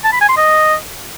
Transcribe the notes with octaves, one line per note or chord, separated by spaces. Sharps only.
A5
B5
G#5
C6
D#5